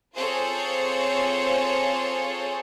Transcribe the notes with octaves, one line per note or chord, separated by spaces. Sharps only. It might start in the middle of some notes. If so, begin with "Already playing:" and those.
C4 F4 G#4 A4 C5 C#5